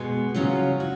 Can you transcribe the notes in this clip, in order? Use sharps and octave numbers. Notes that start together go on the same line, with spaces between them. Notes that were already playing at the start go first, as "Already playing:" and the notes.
Already playing: B2 G#3 B3
C#3 F#3 C#4 F4
F#4